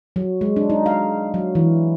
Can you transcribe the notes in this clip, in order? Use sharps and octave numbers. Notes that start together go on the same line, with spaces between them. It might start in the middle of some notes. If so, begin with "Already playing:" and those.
F#3
G#3
D4
D#4
F5
F#3
E3